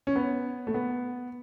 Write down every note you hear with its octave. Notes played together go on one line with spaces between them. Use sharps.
C#4
B3
A3
B3